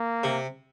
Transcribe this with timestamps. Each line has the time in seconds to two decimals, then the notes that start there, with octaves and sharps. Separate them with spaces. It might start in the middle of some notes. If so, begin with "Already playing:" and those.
Already playing: A#3
0.23 C3